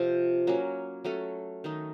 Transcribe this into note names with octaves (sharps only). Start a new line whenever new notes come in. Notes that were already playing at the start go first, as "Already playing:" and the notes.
Already playing: C3 F3 C4 F4
F#3 A#3 C#4
F#3 A3 C#4 A4
D#3 A3 D#4